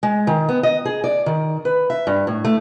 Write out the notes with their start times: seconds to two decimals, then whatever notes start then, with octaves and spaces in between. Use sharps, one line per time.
0.03 G#3
0.27 D#3
0.49 B3
0.63 D#5
0.85 G#4
1.04 D5
1.26 D#3
1.65 B4
1.90 E5
2.07 G2
2.27 A2
2.45 A3